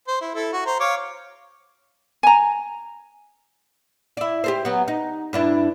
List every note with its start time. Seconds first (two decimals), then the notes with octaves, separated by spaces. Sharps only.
0.08 C5
0.21 E4
0.35 E4 A4
0.53 F#4
0.66 C5 A#5
0.80 C#5 F5 D6
2.23 G#5 A#5
4.17 E4 D5
4.44 G4 A4 C5
4.65 F#3 B3
4.88 D#4
5.33 G2 D4 E4